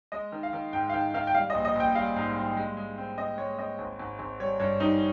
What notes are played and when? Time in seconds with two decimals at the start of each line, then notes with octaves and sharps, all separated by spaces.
0.12 G#3 D#5
0.32 D#3
0.43 F5
0.53 D#3
0.73 G#2 G5
0.90 F5
0.94 D#3 G5
1.14 D#3 F5
1.27 G5
1.34 G3 F5
1.50 D#5
1.54 A#1
1.65 D#5
1.75 A#1 G5
1.95 G3 F5
2.16 G#2
2.36 G3
2.57 G#3
2.77 G#3
2.98 C4
3.17 C4 D#5
3.38 G#3 C#5
3.58 C4 D#5
3.79 G#1
3.99 G#1
4.19 G#1
4.40 G3 C#5
4.60 G2 C#5
4.80 G3 D#4